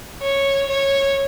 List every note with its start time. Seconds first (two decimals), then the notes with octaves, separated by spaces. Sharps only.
0.22 C#5
0.70 C#5